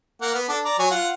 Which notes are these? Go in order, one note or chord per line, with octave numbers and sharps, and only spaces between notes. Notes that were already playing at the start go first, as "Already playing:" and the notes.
A#3 F#5
B3
D4 A4
D5 A#5
F#3 C#5 G#5
F4 F#5